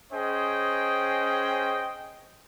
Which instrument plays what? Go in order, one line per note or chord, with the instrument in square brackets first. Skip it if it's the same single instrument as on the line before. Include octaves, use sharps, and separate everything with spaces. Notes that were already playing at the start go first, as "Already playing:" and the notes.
[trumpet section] C#4 G#4 C5 D#5 G5